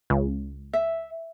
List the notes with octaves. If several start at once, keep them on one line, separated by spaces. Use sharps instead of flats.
C#2
E5